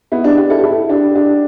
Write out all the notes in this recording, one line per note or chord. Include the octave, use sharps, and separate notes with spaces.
B3 E4
D4 G4
D4 G4
E4 A4
G4
E4 A4
D4 G4
D4 G4